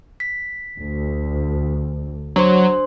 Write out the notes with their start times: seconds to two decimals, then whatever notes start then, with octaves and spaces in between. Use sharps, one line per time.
0.20 B6
0.76 D2
2.36 F#3 D4 C5 C6